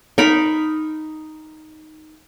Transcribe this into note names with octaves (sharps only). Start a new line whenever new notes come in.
D#4 A#4 B5